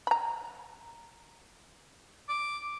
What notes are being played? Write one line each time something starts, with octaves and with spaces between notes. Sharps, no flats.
A#5 B5
D6